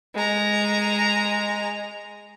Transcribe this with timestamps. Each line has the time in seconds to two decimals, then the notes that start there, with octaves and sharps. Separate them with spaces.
0.15 G#3 A#5